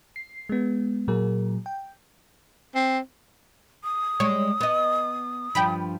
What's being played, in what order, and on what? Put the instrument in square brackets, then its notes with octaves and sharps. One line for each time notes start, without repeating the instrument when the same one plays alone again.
[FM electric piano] C7
G#3 B3
A#2 F#3 G#4 A#4
G5
[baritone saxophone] C4
[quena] D#6
[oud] G3 G#3 [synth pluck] C#5
[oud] B3 D#5
[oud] G2 F3 [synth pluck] G5 B5